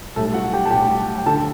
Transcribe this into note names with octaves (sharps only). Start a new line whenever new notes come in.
B1 A2 G3 A3 A4
F#4 F#5
G4 G5
A5
B1 A2 G3 G4 G5
G5
D2 D3 F#3 A4 A5